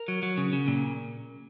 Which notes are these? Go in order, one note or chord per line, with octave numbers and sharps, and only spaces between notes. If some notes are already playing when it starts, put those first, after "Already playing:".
Already playing: A#4
F#3
F#3
C#3
C#3
A#2